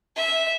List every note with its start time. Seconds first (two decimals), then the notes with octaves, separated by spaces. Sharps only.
0.16 E5